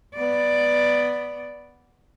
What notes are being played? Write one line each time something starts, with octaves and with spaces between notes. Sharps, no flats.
B3 D5